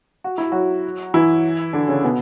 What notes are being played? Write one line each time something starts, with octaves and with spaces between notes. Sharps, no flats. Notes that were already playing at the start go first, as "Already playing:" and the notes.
F#4
E4
F#3 F#4
E3 E4
D3 D4
C#3 C#4
B2 B3